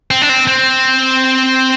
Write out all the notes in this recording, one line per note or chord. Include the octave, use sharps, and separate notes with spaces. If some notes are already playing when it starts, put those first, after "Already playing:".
C4
D4
C4
C4